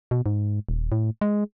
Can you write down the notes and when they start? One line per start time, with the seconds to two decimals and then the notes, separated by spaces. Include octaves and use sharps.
0.11 B2
0.26 G#2
0.69 D#1
0.92 A2
1.21 G#3